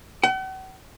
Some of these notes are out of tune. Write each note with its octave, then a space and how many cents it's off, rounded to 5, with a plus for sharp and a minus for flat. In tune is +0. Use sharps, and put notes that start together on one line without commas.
F#5 +45